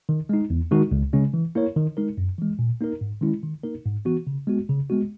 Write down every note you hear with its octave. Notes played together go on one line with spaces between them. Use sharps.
D#3
G#3 D#4
E2
D#3 G#3 D#4 F#4
C#2
C#3 G#3 C#4
E3
A#3 E4 A#4 C#5
D#3
G#3 D#4 A#4
F#2
E3 G#3
A#2
A#3 D#4 A#4
G#2
D#3 G#3 C#4 E4
D#3
A#3 D#4 A#4
G#2
E3 B3 F#4
C#3
G#3 B3 F#4
C#3
G#3 B3 F#4